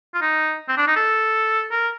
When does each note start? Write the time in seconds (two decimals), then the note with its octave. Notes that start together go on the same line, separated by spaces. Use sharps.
0.14 F4
0.21 D#4
0.68 C4
0.77 D4
0.87 D#4
0.96 A4
1.71 A#4